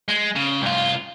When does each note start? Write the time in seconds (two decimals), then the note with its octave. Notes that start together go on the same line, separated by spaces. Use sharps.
0.08 G#3
0.36 C#3
0.62 C2 F4